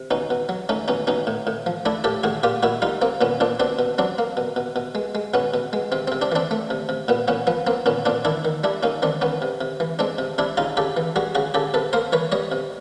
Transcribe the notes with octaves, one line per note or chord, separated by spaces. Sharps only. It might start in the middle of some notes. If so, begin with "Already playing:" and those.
Already playing: C3
B2 C#4 D#4
B2
F#3
A3 C#4 D#4
B2 C#4 D#4
B2 C#4 D#4
A2
A2
F3
A3 D4 E4
A2 G4 A4
A2 F#4 G#4
A#2 F4 G4
A#2 E4 F#4
G3 D#4 F4
A#3 C4
A#2 B3 C#4
A#2 C4 D4
B2 C4 D4
B2
F#3 C4 D4
A#3
B2
B2
B2
G#3
G#3
B2 B3 C#4
B2
G#3
C3 C4
C3 C4
C4 D4
E3 C4 D4
A3
C3
C3
A#2 B3
A#2 B3 C#4
F3 B3
A#3 C4
A#2 B3 C#4
A#2 C4 D4
D#3 D4 E4
D#3
G3 D4 E4
A#3 C#4 D#4
D#3 C4 D4
D#3 B3 C#4
C3
C3
E3
G#3 C4 D4
C3
C3 D4 E4
C#3 D#4 F4
C#3 G4 A4
E3
G3 F#4 G#4
C#3 F#4 G#4
C#3 G4 A4
C3 A4 B4
A#3 A#4 C5
E3 B4 C#5
G3 C#5 D#5
C3